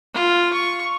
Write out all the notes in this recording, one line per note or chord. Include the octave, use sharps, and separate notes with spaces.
F4
C#6